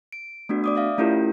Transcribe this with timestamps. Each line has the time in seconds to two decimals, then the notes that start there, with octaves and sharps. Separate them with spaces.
0.12 D7
0.49 A3 B3 D4 F#4
0.64 D5 D6 D#6
0.75 D5 E5 F5
0.98 A3 C#4 E4 F4 G4 A#4